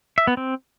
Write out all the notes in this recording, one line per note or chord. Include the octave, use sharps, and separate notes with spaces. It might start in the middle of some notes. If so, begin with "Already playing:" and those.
E5
B3
C4